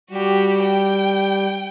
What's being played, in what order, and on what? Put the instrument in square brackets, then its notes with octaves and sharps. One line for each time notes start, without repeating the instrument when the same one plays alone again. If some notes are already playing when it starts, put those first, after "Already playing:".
[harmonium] G3 [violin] F#4 G4
[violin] G5